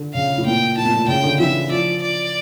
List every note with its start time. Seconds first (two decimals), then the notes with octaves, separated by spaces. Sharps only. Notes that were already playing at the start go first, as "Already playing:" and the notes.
Already playing: D3
0.14 C#3 F5
0.38 A2
0.45 A#2 G5
0.77 A2 A5
0.85 A#2
0.94 A2
1.08 C#3 G5
1.23 D3
1.40 E3 E5
1.70 F3 D5
2.02 D5